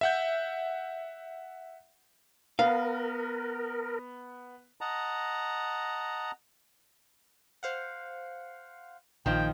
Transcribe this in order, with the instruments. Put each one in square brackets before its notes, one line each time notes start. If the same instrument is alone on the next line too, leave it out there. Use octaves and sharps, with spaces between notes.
[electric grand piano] E5 F#5 G6
[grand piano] B3 [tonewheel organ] A#4 [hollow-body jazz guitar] F5
[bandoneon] D#5 F#5 A5 A#5
[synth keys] C5 F5 F#5
[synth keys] A#1 [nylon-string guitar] D#3 F3 [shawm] G5